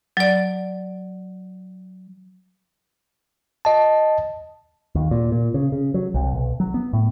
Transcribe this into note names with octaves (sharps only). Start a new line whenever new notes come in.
F#3 D5
D#5 A5
D#2
A#2
A#2
C#3
C#3
F#3
C2
B1
F#3
B3
A2